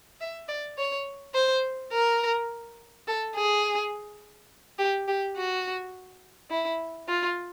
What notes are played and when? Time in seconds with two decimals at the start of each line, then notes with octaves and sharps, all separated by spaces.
0.21 E5
0.48 D5
0.78 C#5
1.34 C5
1.92 A#4
3.07 A4
3.35 G#4
4.79 G4
5.08 G4
5.36 F#4
6.50 E4
7.08 F4